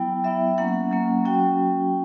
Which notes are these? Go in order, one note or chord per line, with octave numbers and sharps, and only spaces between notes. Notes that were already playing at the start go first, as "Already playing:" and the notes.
Already playing: F#3 B3 E4 G5
F#3 B3 E4 E5
F#3 A#3 C#4 F#5
F#3 A#3 C#4
F#3 C#4 F#4 G5